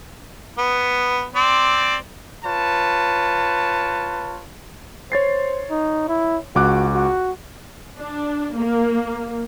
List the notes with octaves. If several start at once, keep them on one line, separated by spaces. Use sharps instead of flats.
B3
C4 D5
F4 B4 C#5 A5
C5 C#5 A6 C7
D#4
E4
C#2 F#4 D6 F#6
F#4
D4
A#3